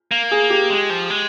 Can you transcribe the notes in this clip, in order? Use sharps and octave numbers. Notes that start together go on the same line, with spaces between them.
A#3
G#4
G4
G#3
F3
G#3